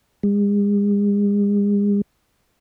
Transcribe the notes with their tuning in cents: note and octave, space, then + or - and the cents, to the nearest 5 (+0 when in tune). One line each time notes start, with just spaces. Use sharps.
G#3 -40